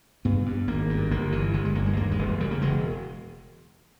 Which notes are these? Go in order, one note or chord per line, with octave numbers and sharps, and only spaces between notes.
G2 B3
G2
G#1 A#3
G2
G1 A#3
G2 E3
G1 G#3
G#3
G2 A#3
G#3
D#2 A#3
G#3
E1
C#3 G3
A#3
E1 G#3